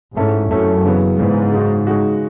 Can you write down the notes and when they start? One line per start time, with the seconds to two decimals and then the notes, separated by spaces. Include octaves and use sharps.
0.16 G#2 A3 C#4 E4 A4
0.51 F#2 A3 C#4 E4 A4
0.85 C#3 E3 B3
1.18 G#2 C#3 E3 B3
1.52 C#3 G#3 D#4 F#4
1.87 C#3 G#3 D#4 F#4